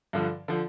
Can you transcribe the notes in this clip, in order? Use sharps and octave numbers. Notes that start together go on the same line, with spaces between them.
G2 D3 F3
D3 F3